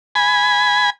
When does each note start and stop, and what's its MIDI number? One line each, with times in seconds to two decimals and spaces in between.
0.15 0.90 80
0.15 0.90 83